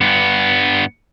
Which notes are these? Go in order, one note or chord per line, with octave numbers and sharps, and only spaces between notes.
G2 B3